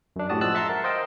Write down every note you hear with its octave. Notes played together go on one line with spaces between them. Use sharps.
F#2 D4
A2 F#4 G4 A5 D#6
F3 G#3 A5 E6 F#6
E5 F#5 A5 A#5 C6
A#4
C5 D#5 F5 G5